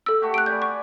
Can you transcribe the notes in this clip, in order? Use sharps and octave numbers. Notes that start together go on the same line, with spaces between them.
A4 E6
A3 F#4 G4
F#6 D7
D5 G#5 B5 G6
C#6